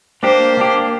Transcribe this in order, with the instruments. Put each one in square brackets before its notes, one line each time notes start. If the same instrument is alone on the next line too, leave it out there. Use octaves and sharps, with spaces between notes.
[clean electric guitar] A#3 D4 G4 [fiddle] C5
[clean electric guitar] A#3 D4 G4